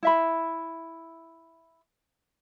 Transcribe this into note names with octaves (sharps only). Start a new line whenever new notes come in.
E4 E5 B5